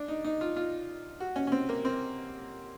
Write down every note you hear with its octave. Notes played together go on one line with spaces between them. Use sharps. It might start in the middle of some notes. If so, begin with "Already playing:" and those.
Already playing: D4
D#4
D#4
F4
F4
F#4
C#4
C#4
C4
A#3
C4